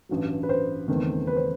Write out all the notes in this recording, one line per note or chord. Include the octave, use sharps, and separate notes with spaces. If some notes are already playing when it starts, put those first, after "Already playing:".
A1 G2 F#3
B4
C5
F#1 E2 D#3 A3 C4
B4
C5